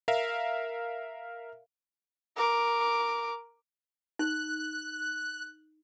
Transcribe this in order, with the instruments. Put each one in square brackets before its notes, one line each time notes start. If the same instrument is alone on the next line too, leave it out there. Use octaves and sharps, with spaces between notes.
[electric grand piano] A#4 E5 F5
[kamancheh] A#4 D6
[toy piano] D#4 [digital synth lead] F#6